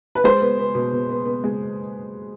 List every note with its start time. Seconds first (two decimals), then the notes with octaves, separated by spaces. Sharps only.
0.15 B4
0.24 G#3 C5
0.41 B3
0.58 B3
0.75 B2
0.92 B2
1.10 B3
1.25 B3
1.44 G#3